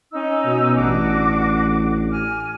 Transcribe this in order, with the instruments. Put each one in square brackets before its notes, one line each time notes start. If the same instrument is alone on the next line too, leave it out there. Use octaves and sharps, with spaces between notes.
[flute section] C#4 D#4 E6
[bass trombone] B2
[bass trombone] A1 [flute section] D4 F#4 D6
[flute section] G#5 F6